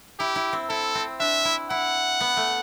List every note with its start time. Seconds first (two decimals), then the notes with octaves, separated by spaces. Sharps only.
0.19 E4 G4
0.36 E4
0.53 C4
0.69 E4 A4
0.95 C4
1.20 D4 E5
1.45 E4
1.70 E4 F#5
2.21 B3
2.37 A3